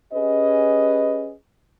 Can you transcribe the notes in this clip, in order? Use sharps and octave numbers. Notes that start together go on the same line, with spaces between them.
C#4 G4 G#4 B4 D#5